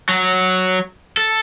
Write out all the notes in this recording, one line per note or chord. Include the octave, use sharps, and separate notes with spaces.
F#3
A4